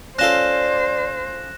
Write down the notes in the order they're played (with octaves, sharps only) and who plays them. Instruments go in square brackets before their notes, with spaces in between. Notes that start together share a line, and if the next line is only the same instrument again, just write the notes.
[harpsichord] C#4 F4 A4 [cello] C5 [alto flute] D5 [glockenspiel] F#6 A#6 E7